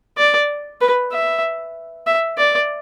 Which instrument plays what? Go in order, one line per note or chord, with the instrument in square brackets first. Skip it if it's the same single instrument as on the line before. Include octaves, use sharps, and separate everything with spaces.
[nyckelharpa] D5
B4
E5
E5
D5